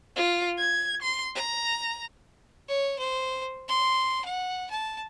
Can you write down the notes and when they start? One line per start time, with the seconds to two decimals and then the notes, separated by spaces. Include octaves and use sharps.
0.16 F4
0.58 G#6
1.02 C6
1.35 A#5
2.68 C#5
2.99 C5
3.69 C6
4.25 F#5
4.70 A5